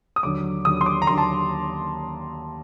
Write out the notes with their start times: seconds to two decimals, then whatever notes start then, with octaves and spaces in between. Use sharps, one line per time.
0.16 D#6
0.23 D#2 D3 F#3 D6
0.65 D#2 D3 F#3 D#6
0.81 C6
0.86 D6
1.02 A#5
1.07 D#2 D3 F#3 C6
1.18 A5